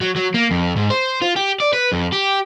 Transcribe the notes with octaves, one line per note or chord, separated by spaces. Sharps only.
F#3
F#3
A#3
F2
G#2
C5
F4
G4
D5
B4
F2
G4